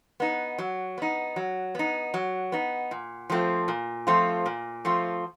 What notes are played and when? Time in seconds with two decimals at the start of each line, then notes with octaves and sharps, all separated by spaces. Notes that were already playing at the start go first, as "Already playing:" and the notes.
0.20 B3 D#4
0.58 F#3
0.98 B3 D#4
1.36 F#3
1.75 B3 D#4
2.14 F#3
2.52 B3 D#4
2.91 A#2
3.30 F3 A3 C4 F4
3.68 A#2
4.07 F3 A3 C4 F4
4.46 A#2
4.85 F3 A3 C4 F4